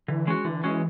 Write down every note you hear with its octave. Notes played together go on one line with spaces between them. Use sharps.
D3 E3
G#3 C#4 F#4
D3 E3
G#3 C#4 F#4